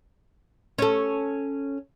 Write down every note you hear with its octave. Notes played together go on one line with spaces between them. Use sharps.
C#4 A4